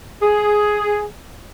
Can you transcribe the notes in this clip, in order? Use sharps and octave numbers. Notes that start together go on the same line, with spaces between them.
G#4